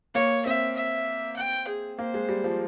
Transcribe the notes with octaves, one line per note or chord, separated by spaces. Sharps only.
A#3 C#5
C4 E5
E5
G5
G#4
A#3 C5
G#3
G3
F3